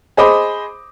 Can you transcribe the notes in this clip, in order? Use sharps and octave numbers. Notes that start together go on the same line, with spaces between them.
G#4 C5 D#5 B5 D6 D#6